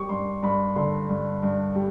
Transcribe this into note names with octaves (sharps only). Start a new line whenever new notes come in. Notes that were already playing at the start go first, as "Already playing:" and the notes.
Already playing: G3 C#6 D6
G2 C6
G2 B5
D3 C6
G2
G2
G3